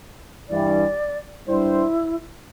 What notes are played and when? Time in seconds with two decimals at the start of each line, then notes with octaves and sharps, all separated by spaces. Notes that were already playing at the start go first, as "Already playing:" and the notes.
0.49 G2 E3 G3 D5
1.47 G2 G3 D4 E4 C5